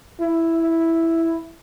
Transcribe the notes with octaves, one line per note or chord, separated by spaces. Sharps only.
E4